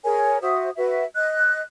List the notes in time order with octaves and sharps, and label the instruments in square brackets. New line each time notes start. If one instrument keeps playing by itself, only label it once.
[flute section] G#4 A#4 C#5 G#5
F#4 C5 E5 D#6
F#4 B4 E5
D#5 F#6